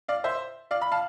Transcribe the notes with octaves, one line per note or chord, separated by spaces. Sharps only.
D5 F5
C5 E5
D5 F5
B5
F5 A5